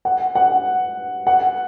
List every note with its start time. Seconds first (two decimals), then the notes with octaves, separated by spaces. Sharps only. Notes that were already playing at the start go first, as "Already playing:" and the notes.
0.05 F#5
0.35 F#5
1.27 F#5